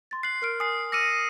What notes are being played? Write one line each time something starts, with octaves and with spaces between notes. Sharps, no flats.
C6 A6
F#6 C7 F#7
A#4 F6 D7
G#5 D#6 C7
D6 E6 F6 A#6 C#7 D#7